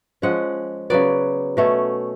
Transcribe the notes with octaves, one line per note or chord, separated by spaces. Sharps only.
F3 G#3 C#4 F#5
C#3 F#3 B3 D5
B2 A3 C#4